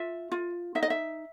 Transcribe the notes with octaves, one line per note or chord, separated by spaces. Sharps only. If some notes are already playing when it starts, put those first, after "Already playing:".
Already playing: F4 E5
F4
D#4 E5
D#5
E5